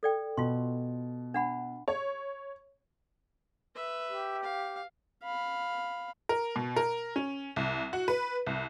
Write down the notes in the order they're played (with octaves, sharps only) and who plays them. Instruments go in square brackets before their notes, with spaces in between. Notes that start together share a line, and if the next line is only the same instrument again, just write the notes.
[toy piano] A4 D5 G5
[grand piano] B2 [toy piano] F4 C6
[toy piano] D4 F#5 B5
[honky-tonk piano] C#5
[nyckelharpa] B4 E5
[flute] G4
[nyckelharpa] F5
F5 B5
[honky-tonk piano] A#4
B2
A#4
C#4
C2
F#4
B4
C2